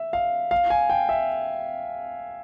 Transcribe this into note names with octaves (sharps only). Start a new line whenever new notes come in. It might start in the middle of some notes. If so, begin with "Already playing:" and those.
Already playing: E5
F5
F5
G#5
G5
E5